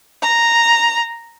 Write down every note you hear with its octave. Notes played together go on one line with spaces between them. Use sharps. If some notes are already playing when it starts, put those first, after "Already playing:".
A#5